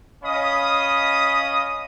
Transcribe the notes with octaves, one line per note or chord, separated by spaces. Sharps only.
C#4 D#5 F5 B5 D#6